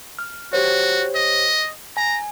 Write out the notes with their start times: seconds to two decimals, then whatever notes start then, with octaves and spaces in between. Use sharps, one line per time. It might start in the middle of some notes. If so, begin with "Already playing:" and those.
0.19 F6
0.53 F#4 G4 C5 C#5
1.15 D#5
1.97 G#5 A#5